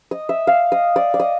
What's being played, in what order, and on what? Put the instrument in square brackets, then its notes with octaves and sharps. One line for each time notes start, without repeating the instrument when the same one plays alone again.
[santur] D#5
E5
F5
D#5
D5
D5
D#5